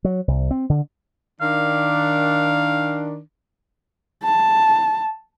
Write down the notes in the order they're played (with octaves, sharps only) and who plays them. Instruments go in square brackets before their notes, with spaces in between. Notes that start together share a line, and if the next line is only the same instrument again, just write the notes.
[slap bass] F#3
C2
C4
D3
[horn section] D#3 D4 [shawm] F5
[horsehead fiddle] A5